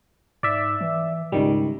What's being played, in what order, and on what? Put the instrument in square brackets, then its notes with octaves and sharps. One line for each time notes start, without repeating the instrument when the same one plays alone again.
[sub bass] G#2 [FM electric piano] D5 E5
[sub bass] E3
[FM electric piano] C#2 D#3 G3 [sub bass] G#2